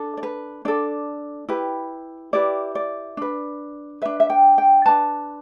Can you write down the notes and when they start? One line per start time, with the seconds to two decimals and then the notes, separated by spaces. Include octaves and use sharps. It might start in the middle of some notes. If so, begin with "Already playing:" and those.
Already playing: D4 A4
0.17 D5
0.23 B4
0.65 D4 A4 D5
1.49 E4 G4 B4
2.33 E4 G4 B4 D5
2.75 D5
3.17 D4 B4
4.02 D4 B4 E5
4.20 E5
4.30 G5
4.58 G5
4.86 D4 B4 A5